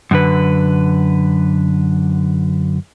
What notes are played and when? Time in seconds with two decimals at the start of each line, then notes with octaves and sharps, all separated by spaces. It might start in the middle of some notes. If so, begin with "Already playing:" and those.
0.11 F#2 D3 B4